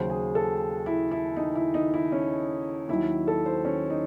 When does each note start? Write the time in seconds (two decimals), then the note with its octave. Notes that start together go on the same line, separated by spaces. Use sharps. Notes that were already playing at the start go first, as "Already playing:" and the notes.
Already playing: D#2 C#3 F#3 C5
0.10 G#4
0.35 A4
0.86 E4
1.11 E4
1.37 D#4
1.55 E4
1.74 D#4
1.94 E4
2.12 C#4
2.88 D#2 D#3 F#3 E4
3.28 A4
3.46 C5
3.65 C#4
3.90 D#4